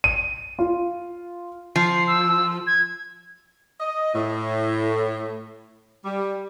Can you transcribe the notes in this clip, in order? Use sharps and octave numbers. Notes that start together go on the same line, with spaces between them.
D#7
F4
F3 C7
E6
G#6
D#5
A2
G3